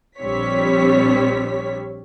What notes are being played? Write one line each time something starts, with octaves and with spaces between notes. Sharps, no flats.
A#1 G3 C4 D4 C#5 B6